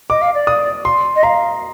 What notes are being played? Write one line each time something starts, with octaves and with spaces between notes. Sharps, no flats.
D#5 D6
F5
D5
D#6
C6
D#5
F5 A#5